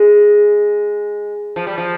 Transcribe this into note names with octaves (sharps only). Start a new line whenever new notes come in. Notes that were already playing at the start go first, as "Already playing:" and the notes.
Already playing: G#3
F3
G3
F3